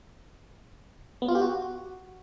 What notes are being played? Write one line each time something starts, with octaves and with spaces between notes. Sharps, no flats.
B3
F4
G4
F#4